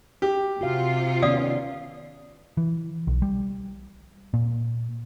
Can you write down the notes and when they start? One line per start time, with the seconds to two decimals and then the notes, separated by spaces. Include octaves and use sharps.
0.22 G4
0.61 C3 F4 F#4 F5
1.22 D#3 B3 C#4 D5 F5 D#6
2.57 E3
3.07 B1
3.22 G3
4.34 A#2